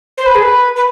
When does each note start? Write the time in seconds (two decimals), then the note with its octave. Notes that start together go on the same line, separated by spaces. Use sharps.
0.18 C5
0.26 B4
0.35 G#4
0.43 B4
0.76 B4